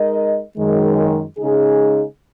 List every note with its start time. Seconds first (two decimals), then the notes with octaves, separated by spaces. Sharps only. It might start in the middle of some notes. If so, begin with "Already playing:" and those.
Already playing: G#3 D#4 A#4 D#5
0.58 F#2 D#3 G#3
1.39 C#3 G#3 D#4 G#4